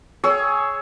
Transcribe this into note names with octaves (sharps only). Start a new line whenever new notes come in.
G#4 C#5 E6